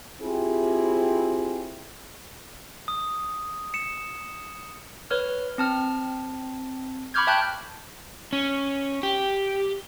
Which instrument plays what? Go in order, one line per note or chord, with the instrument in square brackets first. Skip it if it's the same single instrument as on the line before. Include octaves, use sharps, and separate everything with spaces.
[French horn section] C4 E4 F4 G4 G#4
[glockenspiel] D#6
C#7 E7
[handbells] B4 C#5 F6
C4 A5 F6
B5 C#6 D6 F6 G6 G#6
E5 G5 A5 F#6 G6
[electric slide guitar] C#4
G4